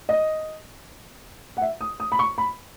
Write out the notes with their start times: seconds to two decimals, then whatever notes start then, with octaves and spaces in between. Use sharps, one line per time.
0.09 D#5
1.57 F#5
1.61 E5
1.81 D#6
2.00 D#6
2.12 B5
2.19 C#6
2.38 B5